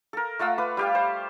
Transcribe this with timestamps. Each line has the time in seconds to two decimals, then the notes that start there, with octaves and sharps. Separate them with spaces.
0.13 A4 A#4
0.39 A3 F4 F#5 E6
0.58 B4 D6
0.77 G3 G4 F5
0.95 C5